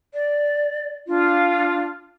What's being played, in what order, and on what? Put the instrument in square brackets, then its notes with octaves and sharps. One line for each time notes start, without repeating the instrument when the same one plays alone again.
[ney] D5
[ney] D4 [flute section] F4